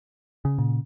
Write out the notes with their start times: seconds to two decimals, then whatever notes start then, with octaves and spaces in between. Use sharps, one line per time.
0.45 C#3
0.58 A#2